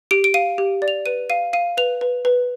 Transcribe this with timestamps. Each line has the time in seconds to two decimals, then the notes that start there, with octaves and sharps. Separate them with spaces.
0.11 G4 D7
0.24 D7
0.34 F5 D#7
0.58 G4
0.82 D5
0.88 F7
1.06 B4 D#7
1.30 F5 D#7
1.53 F5 D#7
1.77 B4 F7
2.01 B4
2.25 B4